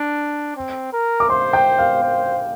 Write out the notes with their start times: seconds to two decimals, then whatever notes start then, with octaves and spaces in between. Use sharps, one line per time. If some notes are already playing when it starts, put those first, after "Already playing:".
Already playing: D4
0.56 C4
0.93 A#4
1.20 D6
1.29 C5 C6
1.53 G5
1.78 F5
2.03 C5